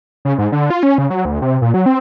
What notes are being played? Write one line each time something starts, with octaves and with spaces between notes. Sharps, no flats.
C#3
G#2
D3
F4
C#4
C#3
F#3
D2
C3
A#2
F#3
C4